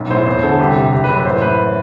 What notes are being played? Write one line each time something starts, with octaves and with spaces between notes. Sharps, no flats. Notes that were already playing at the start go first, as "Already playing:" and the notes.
Already playing: B1 F#2
A2 C5
E2 C5
D3 A4
C2 G4
C3 G4
F#1 G4
B4
F#2
B4
A1 C5
A2 B4